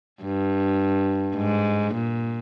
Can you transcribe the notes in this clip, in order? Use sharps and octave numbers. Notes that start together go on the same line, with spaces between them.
G2
G#2
A#2